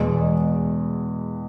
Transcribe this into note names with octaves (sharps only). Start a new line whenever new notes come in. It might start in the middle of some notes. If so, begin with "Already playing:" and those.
Already playing: E2 B2 G#3